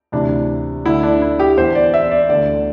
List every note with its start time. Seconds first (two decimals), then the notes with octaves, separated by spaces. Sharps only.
0.12 D2 C3 E3 D4
0.84 D2 D3 E4
1.03 D4
1.22 E4
1.39 G4
1.57 E2 E3 C5
1.75 D5
1.94 E5
2.11 D5
2.29 D2 D3 D5